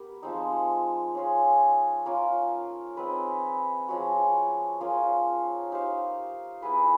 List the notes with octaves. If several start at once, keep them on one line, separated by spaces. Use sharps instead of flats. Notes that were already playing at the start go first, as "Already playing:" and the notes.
Already playing: B3 G4 A#4
F3 G#3 C4 D#4
C#4 F4 G#4
A#3 C#4 F4 A#4
C4 D#4 G#4 B4
F3 G#3 C#4 F#4
A#3 C#4 F4 G#4
D#4 G4 C5 F5
B3 E4 G#4 B4